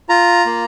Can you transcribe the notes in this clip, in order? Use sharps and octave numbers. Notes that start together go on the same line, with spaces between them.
F4 A#5
A#3